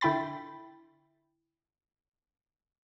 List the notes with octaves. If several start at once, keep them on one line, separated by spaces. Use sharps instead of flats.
D3 E4 G5 B5 A6